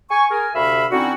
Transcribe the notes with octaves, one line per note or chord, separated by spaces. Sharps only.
G#5 C#6
G#4 A#4 G#5
D2 C3 F#4 E5 F5 B5
D3 C4 C#4 D#4 E4 F#4